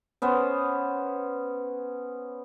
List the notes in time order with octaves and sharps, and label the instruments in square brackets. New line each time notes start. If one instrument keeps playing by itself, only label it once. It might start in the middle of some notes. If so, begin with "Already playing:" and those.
[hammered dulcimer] B3 C#4 C5